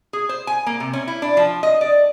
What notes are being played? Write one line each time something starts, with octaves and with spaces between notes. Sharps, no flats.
G#4
C5
G#5
A#3
C3
C#4
E4
D4
F3
D#5
D5